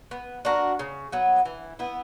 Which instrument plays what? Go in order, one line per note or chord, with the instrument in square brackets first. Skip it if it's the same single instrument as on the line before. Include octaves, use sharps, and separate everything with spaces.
[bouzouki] B3
D4 F#4 A#4
C#3
F#3 B3
E3
B3 E4